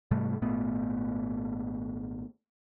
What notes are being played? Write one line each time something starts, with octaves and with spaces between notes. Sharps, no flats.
G#2 C3 G3 A3
G#1 A#2 A3 B3